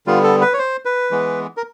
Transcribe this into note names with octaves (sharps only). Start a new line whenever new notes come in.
D3 G3 B3 F4
A4
B4
C#5
C5
B4
E3 G#3 B3
A#4